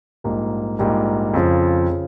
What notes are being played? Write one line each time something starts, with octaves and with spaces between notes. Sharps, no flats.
A#1 G#2 G3 A#3
A#1 G#2 G3 A#3
F2 C#3 F3
C#3 F3